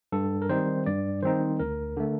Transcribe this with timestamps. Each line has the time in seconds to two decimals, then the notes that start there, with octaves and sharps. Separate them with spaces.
0.12 G2 A4
0.42 A#4
0.49 D#3 G3 C4 D#4 C5
0.86 G2 D5
1.23 D#3 G3 C4 D#4 C5
1.59 D2 A#4
1.97 D3 A3